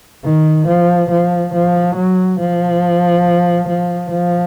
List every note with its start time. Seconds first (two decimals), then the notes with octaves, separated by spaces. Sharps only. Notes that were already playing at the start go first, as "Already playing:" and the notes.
0.24 D#3
0.67 F3
1.10 F3
1.54 F3
1.96 F#3
2.40 F3
3.69 F3
4.10 F3